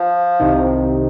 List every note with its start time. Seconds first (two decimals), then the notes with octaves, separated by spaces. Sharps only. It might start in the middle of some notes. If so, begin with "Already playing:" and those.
Already playing: F3
0.39 C2 C3 D#3